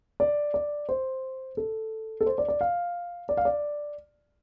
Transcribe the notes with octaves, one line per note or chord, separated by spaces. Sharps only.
D5
D5
C5
A4
A4
C5
D5
D5
F5
D5
F5
D5